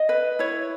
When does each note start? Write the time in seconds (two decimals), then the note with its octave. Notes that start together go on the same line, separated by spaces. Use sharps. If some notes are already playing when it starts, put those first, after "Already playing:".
Already playing: D#5
0.09 B4
0.39 E4 C#5